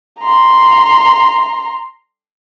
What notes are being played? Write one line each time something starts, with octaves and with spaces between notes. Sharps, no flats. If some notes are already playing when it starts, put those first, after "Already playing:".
A#5 C6